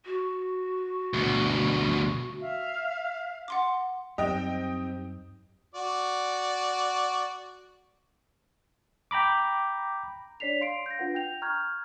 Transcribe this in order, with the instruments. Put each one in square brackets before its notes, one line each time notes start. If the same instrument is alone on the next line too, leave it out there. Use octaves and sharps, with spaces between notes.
[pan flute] F#4
[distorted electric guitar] D2 B2
[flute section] E5 F5
[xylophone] F#5 C6 D6
[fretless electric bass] F#2 F#3 G3 [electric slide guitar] C4 D#4 G4 [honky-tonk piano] D#5 G5
[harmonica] F#4 D5
[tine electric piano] G5 A#5 B5 D6
[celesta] D4 C#5 D5 B6 C7 F7
F5 C6 C7 D7
G6 A#6
D4 F4 B4 F#5
G5 G6 F7
A#5 C#6 F6 G6 G#6